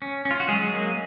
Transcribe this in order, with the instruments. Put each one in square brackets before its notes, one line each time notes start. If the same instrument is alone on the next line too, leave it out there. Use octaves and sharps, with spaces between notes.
[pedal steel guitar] C#4
C#4
F4
F#4
F#3 G#3 G#4
A#3